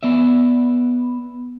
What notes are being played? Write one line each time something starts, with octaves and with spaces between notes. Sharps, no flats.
B3 D5 E5